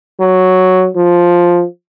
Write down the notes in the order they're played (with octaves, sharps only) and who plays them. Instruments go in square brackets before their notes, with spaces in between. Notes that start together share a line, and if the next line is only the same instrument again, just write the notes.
[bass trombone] F#3
F3